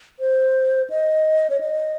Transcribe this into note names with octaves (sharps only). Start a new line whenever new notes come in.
C5
D#5
C#5
D#5